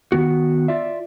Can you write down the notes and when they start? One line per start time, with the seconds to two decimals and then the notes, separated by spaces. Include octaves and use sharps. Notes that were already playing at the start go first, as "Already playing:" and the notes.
0.12 D#3 B3 F#4
0.68 F4 D5 E5